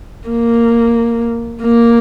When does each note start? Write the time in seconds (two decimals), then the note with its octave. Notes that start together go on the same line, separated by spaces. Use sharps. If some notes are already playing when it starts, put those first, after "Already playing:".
0.29 A#3
1.63 A#3